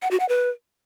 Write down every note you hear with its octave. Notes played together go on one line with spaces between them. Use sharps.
F#5
F#4
F#5
B4